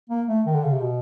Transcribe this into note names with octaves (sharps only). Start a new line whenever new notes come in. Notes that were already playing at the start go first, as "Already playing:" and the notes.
A#3
A3
D#3
D3
C#3
C3
B2